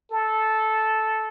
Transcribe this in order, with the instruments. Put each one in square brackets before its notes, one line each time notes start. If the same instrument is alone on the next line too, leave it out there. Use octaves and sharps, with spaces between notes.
[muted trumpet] A4